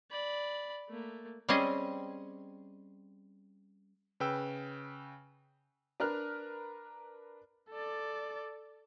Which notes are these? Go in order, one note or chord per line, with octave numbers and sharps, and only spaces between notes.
D5 B5
A3 A#3
G3 C4 C#4 G#4 D#5
C#3 B4 G5 E6
D4 A#4 B4 F6 F#6
A4 D5